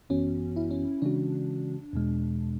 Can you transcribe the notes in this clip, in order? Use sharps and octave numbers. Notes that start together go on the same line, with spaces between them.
G#1 F#2 E3 B3 C#4 F#4
E4
C#4
C#3 E3 G#3 C#4 D4 F#4
E2 B2 G#3